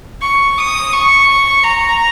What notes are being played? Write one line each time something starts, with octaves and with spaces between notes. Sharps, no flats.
C#6
D#6
C#6
A#5